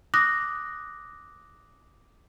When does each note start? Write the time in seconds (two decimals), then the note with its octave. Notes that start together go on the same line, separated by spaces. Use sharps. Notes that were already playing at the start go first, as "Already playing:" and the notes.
0.14 D6 D#6 F#6 A#6